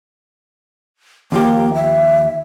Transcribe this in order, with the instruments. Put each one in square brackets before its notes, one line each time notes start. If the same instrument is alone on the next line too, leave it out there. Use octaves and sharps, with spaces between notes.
[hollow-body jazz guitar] D#2 F3 G4 [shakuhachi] A#3
[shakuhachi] E5